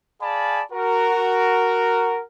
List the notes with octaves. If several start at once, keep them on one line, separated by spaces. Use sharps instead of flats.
G#4 D5 F5 G#5 A5 B5
F#4 A#4